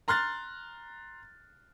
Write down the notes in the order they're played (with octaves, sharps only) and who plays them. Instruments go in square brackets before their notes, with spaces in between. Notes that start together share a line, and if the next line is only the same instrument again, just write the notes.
[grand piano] A#5 C6 F6 F#6 A6